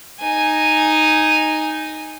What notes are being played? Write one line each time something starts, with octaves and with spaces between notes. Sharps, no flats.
D#4 G#5